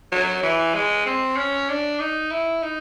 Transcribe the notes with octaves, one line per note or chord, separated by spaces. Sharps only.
F#3
E3
G#3
C4
C#4
D4
D#4
E4
D#4